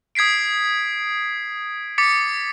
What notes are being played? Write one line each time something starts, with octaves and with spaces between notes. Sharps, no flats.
D#6 G#6 B6 C7 D7
D6 A6 B6 C#7